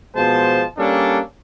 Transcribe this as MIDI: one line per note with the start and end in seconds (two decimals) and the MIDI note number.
0.15 0.63 47
0.15 0.63 53
0.15 0.63 56
0.15 0.63 72
0.15 0.63 81
0.77 1.18 55
0.77 1.18 58
0.77 1.18 61
0.77 1.18 62
0.77 1.18 69